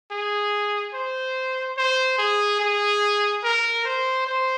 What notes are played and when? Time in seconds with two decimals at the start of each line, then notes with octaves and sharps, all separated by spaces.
0.11 G#4
0.94 C5
1.77 C5
2.18 G#4
2.60 G#4
3.44 A#4
3.85 C5
4.27 C5